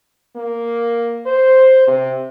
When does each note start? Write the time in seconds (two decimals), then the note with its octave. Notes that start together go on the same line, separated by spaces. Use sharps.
0.36 A#3
1.26 C5
1.87 C3